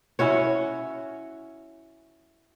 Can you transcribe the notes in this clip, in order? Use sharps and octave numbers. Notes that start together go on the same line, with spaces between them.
C#4 E4 F#4 C#5